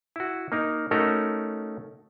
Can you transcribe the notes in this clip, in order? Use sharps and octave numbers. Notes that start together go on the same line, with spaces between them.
E4 F#4
A#3 D#4 A#4
A3 C#4 D#4 F#4 A4 A#4